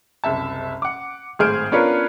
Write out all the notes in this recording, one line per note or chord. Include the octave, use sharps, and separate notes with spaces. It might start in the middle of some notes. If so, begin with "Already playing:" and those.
F#1 C2 E5 A5
F#5 D6
G#1 A2 G#4 C5 F6 D7
B3 C#4 D4 F4 A#4 B4